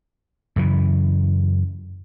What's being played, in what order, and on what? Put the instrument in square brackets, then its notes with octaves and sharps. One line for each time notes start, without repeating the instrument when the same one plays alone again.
[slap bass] F#2 C#3 E3